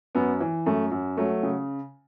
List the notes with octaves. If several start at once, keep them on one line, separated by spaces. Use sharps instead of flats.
F#2 B3
E3
F#2 A3
F#2
F#3 A3
C#3